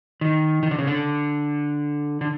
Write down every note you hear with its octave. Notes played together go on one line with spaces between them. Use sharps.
D#3
D#3
D3
C#3
D3
D3